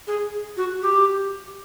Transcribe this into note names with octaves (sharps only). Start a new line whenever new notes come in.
G#4
F#4
G4